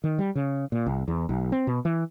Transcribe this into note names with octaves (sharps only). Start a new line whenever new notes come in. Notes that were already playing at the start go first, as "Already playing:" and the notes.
D#3
G3
C#3
A#2
C2
E2
B1
C4
B2
E3